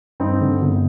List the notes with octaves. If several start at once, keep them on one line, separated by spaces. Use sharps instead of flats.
G2 C4 D#4
D3
G1